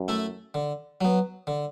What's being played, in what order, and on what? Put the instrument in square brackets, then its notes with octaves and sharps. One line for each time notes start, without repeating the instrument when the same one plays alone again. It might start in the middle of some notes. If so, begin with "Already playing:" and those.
Already playing: [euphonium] F#2
[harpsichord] A3 E4 A4
D3
F#3 B3
D3